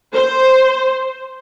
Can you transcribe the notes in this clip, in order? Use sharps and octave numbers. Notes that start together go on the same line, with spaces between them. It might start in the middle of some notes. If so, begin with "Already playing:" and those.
C5